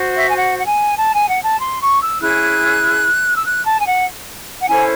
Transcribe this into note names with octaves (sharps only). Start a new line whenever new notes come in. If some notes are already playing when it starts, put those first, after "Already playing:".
Already playing: F#4 C5
E5
G#5
F#5
F#5
G#5
A5
G#5
F#5
A5
C6
C#6
E6
C#4 E4 G#4 F#6
E6
F#6
A5
G#5
F#5
F#5
C#4 E4 A4 C5 G#5